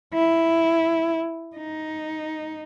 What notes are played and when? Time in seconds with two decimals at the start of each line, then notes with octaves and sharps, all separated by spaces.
0.14 E4
1.57 D#4